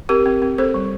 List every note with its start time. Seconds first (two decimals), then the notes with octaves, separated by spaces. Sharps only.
0.09 C4 G4 A#4
0.26 C4
0.42 C4
0.58 C4 A4 C5
0.74 G3